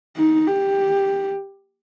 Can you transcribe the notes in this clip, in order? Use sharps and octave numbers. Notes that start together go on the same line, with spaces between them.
D#4
G4